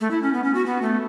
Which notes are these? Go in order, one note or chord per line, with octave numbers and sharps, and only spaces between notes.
A3
E4
C#4
B3
C#4
F#4
B3
A3